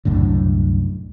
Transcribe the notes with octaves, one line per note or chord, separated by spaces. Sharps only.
C2 F#2 A2 D3